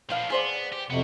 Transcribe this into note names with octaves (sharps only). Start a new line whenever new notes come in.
F3 B3 D4 F5
B3 G#4 C5 D5
G4
F2 C3 B3 F#4